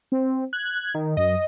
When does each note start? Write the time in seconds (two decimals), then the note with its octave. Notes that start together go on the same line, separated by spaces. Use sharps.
0.12 C4
0.53 F#6 G#6
0.95 D#3
1.17 F#2 D#5